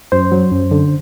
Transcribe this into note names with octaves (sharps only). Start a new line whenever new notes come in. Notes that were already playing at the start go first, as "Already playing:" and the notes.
F#2 C5
F#3
F#2
D3